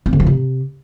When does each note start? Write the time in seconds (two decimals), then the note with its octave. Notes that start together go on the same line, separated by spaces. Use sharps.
0.06 C4
0.13 D3
0.20 F3
0.27 C3